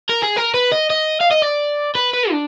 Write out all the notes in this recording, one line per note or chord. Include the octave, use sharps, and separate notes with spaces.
A#4
G#4
A#4
B4
D#5
D#5
F5
D#5
D5
B4
B4
D4